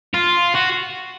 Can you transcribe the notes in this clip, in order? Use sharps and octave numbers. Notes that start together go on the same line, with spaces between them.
F4
F#4